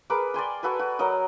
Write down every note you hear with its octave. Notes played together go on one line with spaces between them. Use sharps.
G#4 A#4 B4 D6
D5 G5 G#5 C6
F#4 A4 B4 G#5
F#4
F#3 A#4 D#5